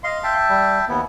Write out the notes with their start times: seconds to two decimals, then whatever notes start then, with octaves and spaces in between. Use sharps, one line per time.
0.04 D#5 F5 C6
0.23 E5 G5 A5
0.49 G3
0.88 D#2 B3 E4